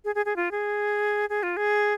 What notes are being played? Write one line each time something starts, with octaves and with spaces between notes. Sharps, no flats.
G#4
G#4
G#4
F4
G#4
G#4
F4
G#4